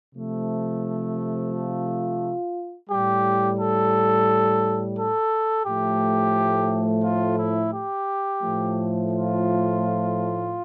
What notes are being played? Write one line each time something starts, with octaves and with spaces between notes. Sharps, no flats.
C3 F3 A3
F4
A2 G3 G4
A4
A4
A2 F3 A3 G4
F4
E4
G4
A2 F3 A3
F4